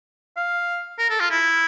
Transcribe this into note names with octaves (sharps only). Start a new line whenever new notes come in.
F5
A#4
A4
F4
E4